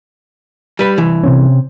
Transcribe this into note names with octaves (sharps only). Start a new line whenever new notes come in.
G3 B4
C2 E3
C3 C4 C#4